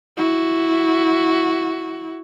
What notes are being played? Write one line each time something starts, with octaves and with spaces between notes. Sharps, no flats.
E4 F#4